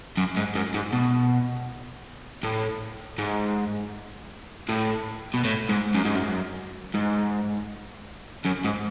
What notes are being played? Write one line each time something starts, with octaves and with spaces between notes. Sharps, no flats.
F#2
G#2
F#2
G#2
B2
A2
G#2
A2
B2
A2
G#2
F#2
G#2
F#2
G#2
F#2
G#2